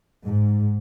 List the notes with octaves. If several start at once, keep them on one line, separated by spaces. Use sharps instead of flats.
G#2